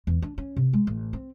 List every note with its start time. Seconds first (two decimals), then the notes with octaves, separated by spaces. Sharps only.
0.07 E2
0.22 D4
0.38 C#4
0.56 C3
0.73 G#3
0.87 A1
1.13 C4